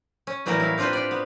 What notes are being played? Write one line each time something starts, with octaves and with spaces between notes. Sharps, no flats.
C#4
A2 E3 F#3 G3 A#3 A#4
E4 F5
C4 D4 F4 B4 C5
G4 D5
B3